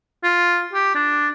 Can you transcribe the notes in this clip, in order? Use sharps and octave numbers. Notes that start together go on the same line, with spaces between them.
F4
G4
D4